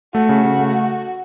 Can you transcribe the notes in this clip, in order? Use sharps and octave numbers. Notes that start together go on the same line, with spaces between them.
A3 F#4
C#3
C#3
A3